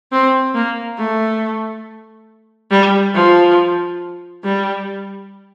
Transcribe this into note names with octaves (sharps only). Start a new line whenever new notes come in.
C4
A#3
A3
G3
F3
G3